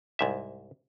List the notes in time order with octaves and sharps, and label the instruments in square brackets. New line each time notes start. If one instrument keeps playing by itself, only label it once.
[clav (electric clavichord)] C2 G#2 E5